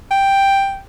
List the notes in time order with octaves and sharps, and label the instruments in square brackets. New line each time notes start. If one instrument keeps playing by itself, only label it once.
[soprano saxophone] G5